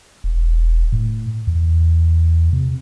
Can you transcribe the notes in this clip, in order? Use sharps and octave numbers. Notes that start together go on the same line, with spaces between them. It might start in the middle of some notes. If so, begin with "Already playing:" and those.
E1
A2
E2
C3